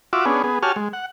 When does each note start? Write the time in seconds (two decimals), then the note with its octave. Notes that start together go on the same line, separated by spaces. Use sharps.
0.13 F4 F#4 E5 D6
0.25 B3 C#4 D4 G#4
0.44 B3 G#4
0.63 F#4 G4 C#5 G#5 A5 F6
0.76 G#3
0.93 F#5